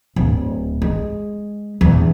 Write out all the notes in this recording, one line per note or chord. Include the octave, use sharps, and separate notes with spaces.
D1
G#3
A#1 E2